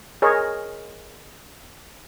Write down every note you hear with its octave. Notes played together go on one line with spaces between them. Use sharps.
G#4 A#4 C#5 D#5